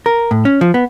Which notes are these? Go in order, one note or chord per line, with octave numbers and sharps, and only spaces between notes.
A#4
A2
C#4
F3
B3